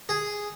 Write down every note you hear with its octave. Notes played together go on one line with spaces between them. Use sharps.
G#4